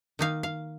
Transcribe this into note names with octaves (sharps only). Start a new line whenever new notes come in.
D#3 A#3 D#4 F5
F5